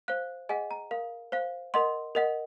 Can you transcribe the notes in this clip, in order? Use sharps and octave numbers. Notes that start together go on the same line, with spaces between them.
C5 F5 F#6
G#4 D#5 F#5 G#5
A#5
A#4 F5
C5 F5
A#4 D#5 F#5 C6
A#4 D#5 F#5